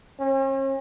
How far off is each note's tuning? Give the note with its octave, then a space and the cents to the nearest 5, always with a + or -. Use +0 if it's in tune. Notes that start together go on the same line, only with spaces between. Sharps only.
C#4 -45